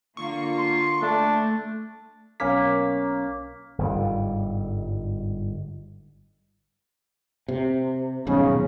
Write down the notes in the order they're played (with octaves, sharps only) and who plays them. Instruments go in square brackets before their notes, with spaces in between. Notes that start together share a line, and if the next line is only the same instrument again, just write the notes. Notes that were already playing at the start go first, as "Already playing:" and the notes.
[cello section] D3 A#3 F4 [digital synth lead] C#6
[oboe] C6
[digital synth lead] A3 [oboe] D4
[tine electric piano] B1 C#4 B6 [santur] A#3
[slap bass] G1 G#2 G3
[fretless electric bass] C3
[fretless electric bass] D#1 B1 G#2 [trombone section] C#3